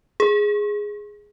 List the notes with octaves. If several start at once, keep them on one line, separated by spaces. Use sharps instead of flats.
G#4